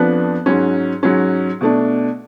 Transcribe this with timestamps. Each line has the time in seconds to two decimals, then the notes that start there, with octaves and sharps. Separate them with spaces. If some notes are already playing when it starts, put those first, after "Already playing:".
Already playing: F2 F3 B3 D4 F#6
0.46 G#2 F#3 C#4
1.03 G#2 F#3 C#4
1.61 B2 A3 D4